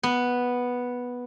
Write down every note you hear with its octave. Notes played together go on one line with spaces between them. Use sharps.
B3